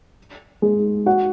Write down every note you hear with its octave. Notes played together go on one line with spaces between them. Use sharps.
G#3 G#4
F#4 F#5